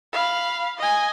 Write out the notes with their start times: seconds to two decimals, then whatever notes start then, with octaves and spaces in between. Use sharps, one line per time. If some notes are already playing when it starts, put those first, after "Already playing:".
0.13 F5 B5
0.78 D#5 G#5